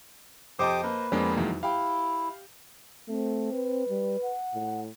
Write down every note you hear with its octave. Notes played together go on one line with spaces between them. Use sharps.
F2 G4 C5 D#5 A5 D6 D#6
A#3 B4
F2 G#3 A#3 B3 D4 C5
E2 D#3 F#3
E4 G4 F5 G5
A3 C4
B4
G3
F#5
A2